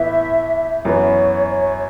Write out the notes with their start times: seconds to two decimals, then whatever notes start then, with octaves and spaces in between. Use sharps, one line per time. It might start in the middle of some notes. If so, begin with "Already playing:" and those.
Already playing: A2 E3 B3 E4 E5
0.85 F#2 E3 B3 C#5
1.50 C#5